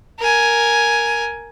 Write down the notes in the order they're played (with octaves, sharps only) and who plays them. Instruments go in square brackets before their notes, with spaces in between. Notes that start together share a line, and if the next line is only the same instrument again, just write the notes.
[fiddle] A#4 G#5